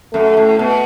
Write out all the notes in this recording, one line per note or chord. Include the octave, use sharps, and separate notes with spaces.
F#2 A3
A2
B2